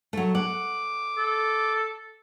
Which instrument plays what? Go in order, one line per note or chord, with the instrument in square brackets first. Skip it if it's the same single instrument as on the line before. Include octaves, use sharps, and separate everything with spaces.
[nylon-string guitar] F#3 A3
[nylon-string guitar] F#5 [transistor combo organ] D6
[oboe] A4